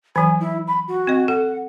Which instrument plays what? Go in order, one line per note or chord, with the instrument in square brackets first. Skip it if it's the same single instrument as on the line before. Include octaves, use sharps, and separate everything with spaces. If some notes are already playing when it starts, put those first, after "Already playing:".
[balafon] E3 F#3 [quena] G#5
[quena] E4
B5
F#4
[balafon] C4 D#5
[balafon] A4 [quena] F#5